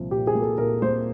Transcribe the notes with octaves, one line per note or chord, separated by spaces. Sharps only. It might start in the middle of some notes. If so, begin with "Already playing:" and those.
Already playing: C2 A#2 F3 A#3
A#2 G4
G#4
A#3
A4
A#2 A#4
A#3 C5